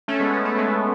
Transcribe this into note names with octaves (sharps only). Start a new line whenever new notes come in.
A3 C#4
G#3 B3
A3 C#4
A3 C#4
G#3 B3